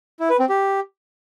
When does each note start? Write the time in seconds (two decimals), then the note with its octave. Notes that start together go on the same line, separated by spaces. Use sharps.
0.20 E4
0.30 B4
0.39 C4
0.49 G4